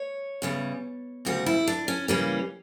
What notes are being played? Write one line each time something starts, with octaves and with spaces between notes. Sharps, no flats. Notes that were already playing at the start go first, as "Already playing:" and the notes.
Already playing: C#5
E2 C#3 G3
D2 C#3 G3 F#4
E4
D4
C#4
C#3 E3 G3 A#3 C#4